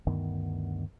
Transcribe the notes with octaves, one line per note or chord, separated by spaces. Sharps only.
D2 G2 D#3 B3